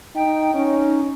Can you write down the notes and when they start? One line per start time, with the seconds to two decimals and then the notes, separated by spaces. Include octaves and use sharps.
0.16 D#4 G5
0.55 C#4 D#4